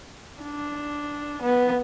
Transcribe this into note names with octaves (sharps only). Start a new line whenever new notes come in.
D4
B3